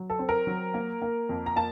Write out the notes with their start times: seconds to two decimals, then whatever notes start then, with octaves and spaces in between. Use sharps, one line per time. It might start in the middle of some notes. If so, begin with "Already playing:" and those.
Already playing: F#3
0.10 A4
0.19 C4
0.29 A#4
0.47 F#3
0.74 A#3
1.02 A#3
1.29 F2
1.46 A#5
1.56 A#3 A5